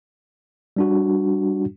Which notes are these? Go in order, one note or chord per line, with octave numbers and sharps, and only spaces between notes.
G3 D4 F#4